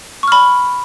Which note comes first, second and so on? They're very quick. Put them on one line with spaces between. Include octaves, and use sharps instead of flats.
C#6 F6 B5